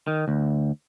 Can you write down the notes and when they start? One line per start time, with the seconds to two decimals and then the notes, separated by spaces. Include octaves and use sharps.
0.07 D#3
0.28 D2